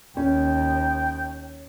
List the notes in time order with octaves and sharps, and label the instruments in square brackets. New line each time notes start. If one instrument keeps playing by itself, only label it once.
[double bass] D#2 [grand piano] C#4 [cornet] G5